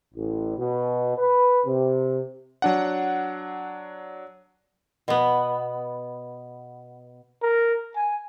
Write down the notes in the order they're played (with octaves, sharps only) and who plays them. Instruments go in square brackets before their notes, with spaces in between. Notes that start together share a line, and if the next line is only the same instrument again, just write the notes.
[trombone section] A1
B2
B4
C3
[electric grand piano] F#3 D4 F#5
[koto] B2 B3
[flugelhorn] A#4
G#5